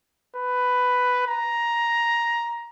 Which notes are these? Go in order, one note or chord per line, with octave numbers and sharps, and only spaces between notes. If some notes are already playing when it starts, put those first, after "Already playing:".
B4
A#5